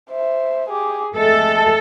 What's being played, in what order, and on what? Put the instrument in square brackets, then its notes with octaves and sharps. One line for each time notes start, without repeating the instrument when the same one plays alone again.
[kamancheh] C5 E5
G4 G#4
[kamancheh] G#3 A3 [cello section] A4